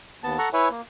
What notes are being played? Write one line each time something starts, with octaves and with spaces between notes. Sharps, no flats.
D#2 B3 A5
A4 F#5 A#5 C#6
E4 B4 C#5 E5 G#5
A#3